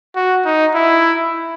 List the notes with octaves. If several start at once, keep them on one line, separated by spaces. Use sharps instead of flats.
F#4
D#4
E4